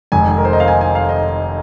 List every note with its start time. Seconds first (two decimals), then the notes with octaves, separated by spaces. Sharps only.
0.12 F1 F2 D#3 G#3 G#5
0.38 A#4
0.45 C5
0.53 D#5
0.60 F5
0.68 G#5
0.81 G#5
0.95 F5
1.09 D#5